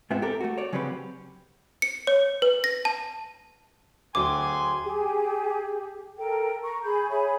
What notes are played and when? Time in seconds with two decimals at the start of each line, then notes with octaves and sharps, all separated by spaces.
0.10 G#2 B3 C4 F4 E5
0.22 G4 A4 A#4
0.40 A3 F#4
0.58 C#5 D5
0.73 C#3 F#3 C4 C#4 G4 B4
1.82 C#7
2.07 C#5
2.42 B4
2.64 A#6
2.85 A5
4.15 D2 F#3 G#4 G5 G#5 C6 D6
4.83 G4 G#4
6.17 A4 A#4 G5
6.62 A#5 C#6
6.83 G#4 B5 G6
7.10 G#4 C#5 E5 B5